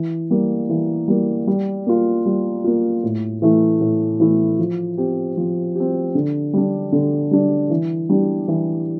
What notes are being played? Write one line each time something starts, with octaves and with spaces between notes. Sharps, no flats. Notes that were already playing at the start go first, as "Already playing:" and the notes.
Already playing: E3
G3 A#3
E3
G3 A#3
G3
A#3 F4
G3
A#3 F4
A2
E3 A3 E4
A2
E3 A3 E4
F3
C4 G4
F3
C4 G4
D3
G3 D4
D3
G3 D4
E3
G3 D4 G4
E3